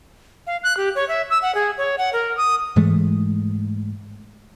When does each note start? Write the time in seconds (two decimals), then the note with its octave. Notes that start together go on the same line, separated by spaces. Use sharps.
0.47 F5
0.64 F#6
0.77 G4
0.95 C#5
1.09 E5
1.31 E6
1.42 F#5
1.55 G#4
1.78 C#5
1.98 F#5
2.13 A#4
2.37 D#6
2.76 G#2 E3 G#3 A3